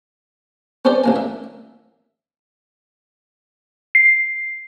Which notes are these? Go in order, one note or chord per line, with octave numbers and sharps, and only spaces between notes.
B3 C#4 G4 C5 D5
A1 A#3 G#5
E5
C7